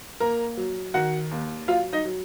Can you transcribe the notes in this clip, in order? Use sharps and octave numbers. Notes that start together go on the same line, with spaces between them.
A#3 A#4 A#5
F#3
D#3 F#4 F#5
D#2
F#3 F4 F5
D#4 D#5
F#3